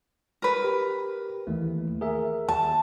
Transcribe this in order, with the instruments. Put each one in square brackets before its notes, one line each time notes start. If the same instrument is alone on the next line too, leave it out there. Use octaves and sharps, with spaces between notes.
[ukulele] A#4 B4
[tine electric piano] G4
D#2 E3 A3
G#4 A#4 E5
[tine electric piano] D#2 [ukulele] A5